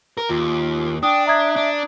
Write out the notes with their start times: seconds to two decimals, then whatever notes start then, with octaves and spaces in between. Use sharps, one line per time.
0.18 A#4
0.29 D#2 F4
1.03 D4 G5 D#6
1.27 E5 A#5 D#6 G#6
1.56 D4